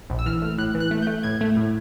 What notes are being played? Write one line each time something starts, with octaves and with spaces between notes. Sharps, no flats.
A#1
E6
E3 F6
A3
A2 F#6
E3
F#6
A3
A3 G6
A2 G#6
A3
A2